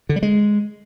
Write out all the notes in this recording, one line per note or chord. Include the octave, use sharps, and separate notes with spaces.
D3
G3
G#3